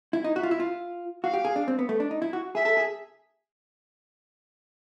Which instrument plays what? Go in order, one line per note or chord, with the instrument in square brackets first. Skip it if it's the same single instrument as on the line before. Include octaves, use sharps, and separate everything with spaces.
[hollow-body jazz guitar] E4
D#4
[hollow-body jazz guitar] F#4 [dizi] E5
[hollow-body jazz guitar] F4
E4
F4
[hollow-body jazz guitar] F#4 [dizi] F5
[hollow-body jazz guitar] G4
G#4
D4
C4
B3
A3
D4
D#4
E4
F#4
[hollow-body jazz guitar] G#4 [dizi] E5
[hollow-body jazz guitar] A4
G#4